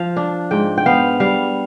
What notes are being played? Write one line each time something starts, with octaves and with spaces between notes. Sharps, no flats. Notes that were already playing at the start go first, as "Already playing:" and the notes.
Already playing: F3 C5 F5
D4
G#2 G5
G5
B3 F5
G3 F5